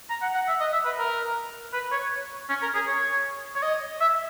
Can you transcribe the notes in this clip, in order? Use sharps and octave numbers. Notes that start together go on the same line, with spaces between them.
A#5
F#5
F#5
E5
D#5
E5
B4
A#4
B4
C#5
C#4
A#4
G#4
C#5
C#5
D#5
E5